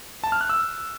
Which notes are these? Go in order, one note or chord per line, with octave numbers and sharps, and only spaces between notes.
A5
F6
F#6
E6